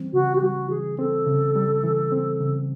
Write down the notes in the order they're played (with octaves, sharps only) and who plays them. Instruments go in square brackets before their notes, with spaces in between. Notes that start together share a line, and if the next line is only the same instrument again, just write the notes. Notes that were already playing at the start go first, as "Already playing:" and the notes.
Already playing: [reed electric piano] E3 G3 C4
[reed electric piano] C#3 [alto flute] F#4
[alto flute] G4
[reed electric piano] G3 [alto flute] F#4
[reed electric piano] E3 [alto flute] G#4
[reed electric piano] C4 [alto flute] A4
[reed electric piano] C#3
G3
E3
C4
C#3